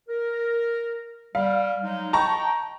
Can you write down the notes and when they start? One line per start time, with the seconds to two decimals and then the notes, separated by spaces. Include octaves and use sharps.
0.09 A#4
1.35 G3 F5
1.83 F#3 G#3 D#4
2.13 D#5 G5 A5 A#5 C#6